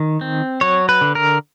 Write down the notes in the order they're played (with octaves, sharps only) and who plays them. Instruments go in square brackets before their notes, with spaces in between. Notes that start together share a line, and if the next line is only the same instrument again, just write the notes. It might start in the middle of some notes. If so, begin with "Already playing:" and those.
Already playing: [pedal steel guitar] D#3
C4
F#3 C#5
B4
D3
A#4